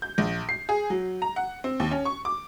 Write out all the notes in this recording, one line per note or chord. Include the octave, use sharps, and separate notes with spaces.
G6
A#1
C7
G#4
F#3
A#5
F#5
C4
D#2
C#4
C#6
D6